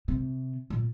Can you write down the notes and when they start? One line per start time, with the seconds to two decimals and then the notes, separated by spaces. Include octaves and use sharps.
0.08 C3
0.70 A#2